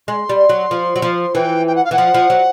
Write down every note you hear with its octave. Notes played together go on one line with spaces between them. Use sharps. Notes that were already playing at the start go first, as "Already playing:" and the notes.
G#3 C6
G3
F#3
F3
F#3
F3
E3 G5
G5
F#5
F5
E3 F#5
F3
F3
F#3